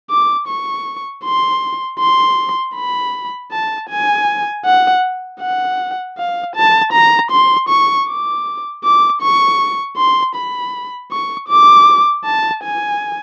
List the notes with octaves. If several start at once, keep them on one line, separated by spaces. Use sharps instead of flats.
D6
C#6
C6
C6
B5
A5
G#5
F#5
F#5
F5
A5
A#5
C6
C#6
D6
D6
C#6
C6
B5
C#6
D6
A5
G#5